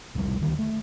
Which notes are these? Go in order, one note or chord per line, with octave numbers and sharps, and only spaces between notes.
E1 C2 D3 G3
D2 D#3
A3